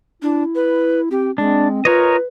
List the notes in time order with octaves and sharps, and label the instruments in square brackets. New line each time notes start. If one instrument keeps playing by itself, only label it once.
[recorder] D4 [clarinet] E4
[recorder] B4
[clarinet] C4 [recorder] G4
[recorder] G#3 [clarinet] C4 [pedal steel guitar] D4
[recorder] F4 [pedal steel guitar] A#4 C#5 D#5 [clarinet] B4